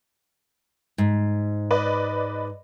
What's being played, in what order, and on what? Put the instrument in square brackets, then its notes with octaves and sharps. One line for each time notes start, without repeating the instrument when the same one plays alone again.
[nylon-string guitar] G#2
[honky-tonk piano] B4 D5 D#5